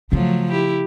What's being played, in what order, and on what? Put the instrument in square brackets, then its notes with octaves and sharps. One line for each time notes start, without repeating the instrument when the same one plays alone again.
[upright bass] C#3 F4 [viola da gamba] F3 F#3 A3
[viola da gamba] E4 G4